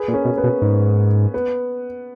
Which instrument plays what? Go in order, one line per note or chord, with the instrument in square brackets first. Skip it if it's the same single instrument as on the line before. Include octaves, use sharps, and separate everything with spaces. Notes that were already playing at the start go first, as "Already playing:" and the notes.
Already playing: [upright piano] G#4 B4
[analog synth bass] A#2
[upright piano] A#3 C#4
[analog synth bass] B2
[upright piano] B3
[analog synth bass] B2
G#2
[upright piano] B3